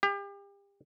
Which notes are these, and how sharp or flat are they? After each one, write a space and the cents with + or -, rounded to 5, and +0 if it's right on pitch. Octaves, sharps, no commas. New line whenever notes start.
G4 +35